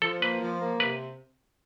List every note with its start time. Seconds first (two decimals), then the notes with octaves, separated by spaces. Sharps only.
0.02 F3 A4
0.22 A#3 B4
0.41 F3
0.61 A#3
0.80 C3 B4